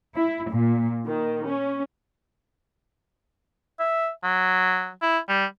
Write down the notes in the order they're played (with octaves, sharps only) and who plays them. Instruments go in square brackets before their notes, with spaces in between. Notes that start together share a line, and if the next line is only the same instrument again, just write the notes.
[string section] E4
A#2
D#3
C#4
[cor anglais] E5
F#3
E4
G3